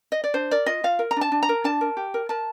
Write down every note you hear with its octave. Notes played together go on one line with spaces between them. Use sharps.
D#5
D5
D4 C5
A#4 D5
F4 D#5
F4 F5
A#4
A#5
D4 A5
D4
A#5
A#4
D4 A5
A#4
G4
A#4
A#4 A5